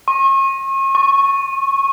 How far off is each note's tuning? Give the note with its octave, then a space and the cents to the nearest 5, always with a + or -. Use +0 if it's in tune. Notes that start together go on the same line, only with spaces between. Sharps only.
C#6 -40
C#6 -10